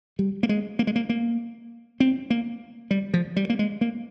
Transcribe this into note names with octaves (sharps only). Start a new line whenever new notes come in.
G3
A#3
G#3
A#3
G#3
A#3
A#3
C4
A#3
G3
F3
G3
A#3
G#3
A#3